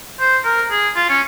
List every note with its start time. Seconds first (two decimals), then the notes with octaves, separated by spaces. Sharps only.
0.20 C5
0.45 A#4
0.71 G#4
0.96 F4
1.09 C#4